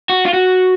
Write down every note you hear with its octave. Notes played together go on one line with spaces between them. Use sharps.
F#4
F4
F#4